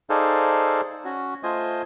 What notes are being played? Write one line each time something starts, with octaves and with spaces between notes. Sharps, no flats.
D#4 G#4 A4 C5 D5 F5
C#4 F#4
A3 F4 C5 D#5 G#5